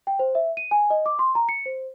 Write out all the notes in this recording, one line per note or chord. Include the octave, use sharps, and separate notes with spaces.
G5
C5
E5
D#7
G#5
D#5
D6
C6
A#5
C#7
C5